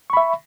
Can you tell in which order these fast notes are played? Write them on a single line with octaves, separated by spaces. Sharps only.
C#6 B5 E5